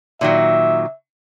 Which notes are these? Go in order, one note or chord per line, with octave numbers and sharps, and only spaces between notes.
A#2 D#3 F#3 E5